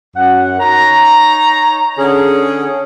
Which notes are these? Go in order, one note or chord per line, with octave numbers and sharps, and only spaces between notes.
F#2 F#5
D#4 C#5 A#5
D3 C#4 G#4